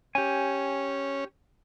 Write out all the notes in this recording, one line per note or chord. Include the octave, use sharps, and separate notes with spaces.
C#4 G4 G#5